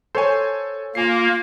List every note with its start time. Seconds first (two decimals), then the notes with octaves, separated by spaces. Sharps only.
0.15 A4 C5 C#5 G#5
0.95 A#3 F4 G#5 C7